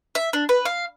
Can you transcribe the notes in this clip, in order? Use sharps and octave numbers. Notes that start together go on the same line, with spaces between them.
E5
D4
B4
F5